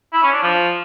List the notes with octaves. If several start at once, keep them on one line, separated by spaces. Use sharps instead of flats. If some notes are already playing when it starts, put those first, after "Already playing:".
E4
C#4
D4
F3